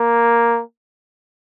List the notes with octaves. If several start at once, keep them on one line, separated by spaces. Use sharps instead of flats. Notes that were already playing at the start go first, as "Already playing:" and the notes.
Already playing: A#3